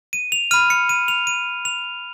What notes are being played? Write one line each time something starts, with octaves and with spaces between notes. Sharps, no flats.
D#7
F7
B5 F6 D#7
C#7
D#7
F7
D#7
F7